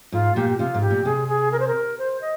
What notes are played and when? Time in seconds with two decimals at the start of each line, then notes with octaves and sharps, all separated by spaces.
0.12 G#2 F4
0.36 A#2 G4
0.50 G4
0.59 C3 F4
0.74 G#2
0.82 G4
0.90 A#2
1.05 C3 G#4
1.28 G#4
1.52 A#4
1.60 C5
1.68 A#4
1.99 C5
2.21 D#5